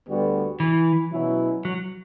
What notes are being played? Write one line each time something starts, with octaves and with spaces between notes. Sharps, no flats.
D2 D3 G3 B3 F#4
E3
B2 F#3 C#4 E4
F#3